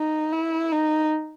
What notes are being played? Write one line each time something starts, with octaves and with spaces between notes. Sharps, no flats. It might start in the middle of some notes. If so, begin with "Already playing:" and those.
Already playing: D#4
E4
D#4